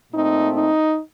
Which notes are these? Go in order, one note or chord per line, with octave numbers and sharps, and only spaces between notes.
A#2 A3 C4 D#4
D#4